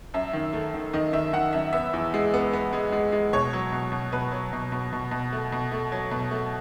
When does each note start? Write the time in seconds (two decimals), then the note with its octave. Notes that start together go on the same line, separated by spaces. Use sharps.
0.14 F#2 E5
0.33 D#3
0.53 A3
0.74 D#3
0.93 D#3 D#5
1.13 D#3 E5
1.33 D#3 F#5
1.53 F#2 E5
1.73 B3 E5
1.94 E2
2.14 G#3
2.34 B3
2.53 B3
2.73 G#3
2.92 G#3
3.12 G#3
3.33 B2 C#5
3.53 F#3
3.73 B2
3.92 B2
4.12 B2 B4
4.32 F#3
4.53 B2
4.72 B2
4.93 B2
5.11 B2
5.33 A3
5.52 B2
5.72 A3
5.92 F#3
6.11 B2
6.31 A3